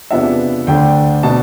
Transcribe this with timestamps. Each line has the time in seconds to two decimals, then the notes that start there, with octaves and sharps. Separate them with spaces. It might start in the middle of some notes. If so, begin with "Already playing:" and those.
0.11 E2 C3 F3 B3 D4 E5
0.67 D2 D3 A3 D4 G5
1.23 B2 B3 D4 A5